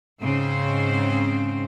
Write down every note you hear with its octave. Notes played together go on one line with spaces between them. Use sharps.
G#2 C#3 C4 C5